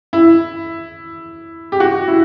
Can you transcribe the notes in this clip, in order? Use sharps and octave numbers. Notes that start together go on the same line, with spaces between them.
E4
G4
F#4
E4